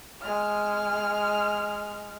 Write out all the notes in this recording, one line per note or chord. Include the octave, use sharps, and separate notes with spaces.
G#3 F6